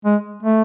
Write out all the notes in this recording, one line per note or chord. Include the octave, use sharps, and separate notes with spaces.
G#3
A3